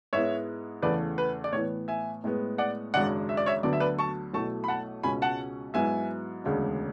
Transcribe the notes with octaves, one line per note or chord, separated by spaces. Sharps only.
G#2 G#3 B3 E4 C#5 E5
E2 C#3 E3 A3 B4 D5
B4
D5
A2 E3 B3 C#5
E5 G#5
A2 G#3 B3
D5 F#5
G#1 F#2 C#3 G#3 D4 D5 F#5
E5
D5
C#5 E5
D2 D3 F#3 B3 D5
E5
B4 D5
A5 C#6
B1 B2 A3 E4 A5 C#6
B5
F#5 A5
C#2 B2 G#3 C#4 G#5 B5
F#5 A5
G#2 F#3 B3 E4 E5 G#5
E1 D2 C#3 G#3 D4